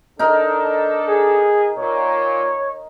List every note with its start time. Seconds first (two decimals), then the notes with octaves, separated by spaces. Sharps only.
0.19 D4 D#4 A4 A#4
1.08 G#4
1.78 A#2 C#5